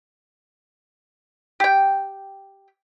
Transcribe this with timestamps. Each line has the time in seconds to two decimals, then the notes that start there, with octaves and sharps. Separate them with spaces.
1.60 G4 G5